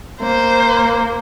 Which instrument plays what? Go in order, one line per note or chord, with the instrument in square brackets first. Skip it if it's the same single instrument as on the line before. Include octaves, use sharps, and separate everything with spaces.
[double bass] A#3 [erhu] C5